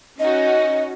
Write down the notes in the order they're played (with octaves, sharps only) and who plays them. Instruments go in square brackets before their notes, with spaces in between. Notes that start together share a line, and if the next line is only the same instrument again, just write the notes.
[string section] C#4 D#4 F#4 [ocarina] D#5